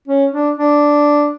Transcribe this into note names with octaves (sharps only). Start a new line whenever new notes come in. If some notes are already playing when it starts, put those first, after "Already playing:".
C#4
D4
D4